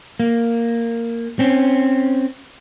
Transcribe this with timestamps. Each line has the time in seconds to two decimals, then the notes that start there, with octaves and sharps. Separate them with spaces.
0.20 A#3
1.39 C4 C#4